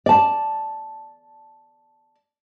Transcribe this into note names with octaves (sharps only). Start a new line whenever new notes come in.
D5 A5